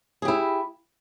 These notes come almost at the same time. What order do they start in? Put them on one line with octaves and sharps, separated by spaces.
G#4 G4 E4